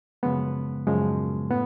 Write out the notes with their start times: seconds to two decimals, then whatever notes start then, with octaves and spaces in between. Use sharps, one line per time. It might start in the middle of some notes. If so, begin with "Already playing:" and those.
0.23 F#2 C#3 F3 G#3 B3
0.87 F#2 C#3 F3 G#3
1.50 A2 B3